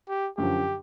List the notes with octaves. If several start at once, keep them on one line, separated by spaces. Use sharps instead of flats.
G4
F#2 D3 F3 G4